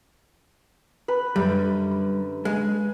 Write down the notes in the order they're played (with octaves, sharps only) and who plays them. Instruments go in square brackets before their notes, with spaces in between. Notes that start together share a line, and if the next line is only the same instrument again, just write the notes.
[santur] B4
[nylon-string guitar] F#2 D3 [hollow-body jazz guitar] G3
[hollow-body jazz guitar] G#3